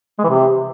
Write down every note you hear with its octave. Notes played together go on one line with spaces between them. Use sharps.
G#3
E3
C3